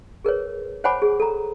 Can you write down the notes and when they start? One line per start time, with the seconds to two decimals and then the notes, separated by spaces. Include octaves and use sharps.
0.25 G#4 A#4 B4 C#5
0.84 C5 C#5 F#5 G#5 B5 D6
1.02 G#4
1.20 A4 A#5